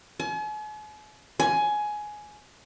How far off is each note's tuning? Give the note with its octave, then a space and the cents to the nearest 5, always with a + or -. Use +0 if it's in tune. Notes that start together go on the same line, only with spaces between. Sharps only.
G#5 +45
G#5 +15